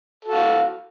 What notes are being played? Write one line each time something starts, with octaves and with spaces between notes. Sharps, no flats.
F#4 A4 F5